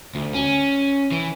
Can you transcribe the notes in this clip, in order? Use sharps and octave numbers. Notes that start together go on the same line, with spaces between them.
D2
C#4
E3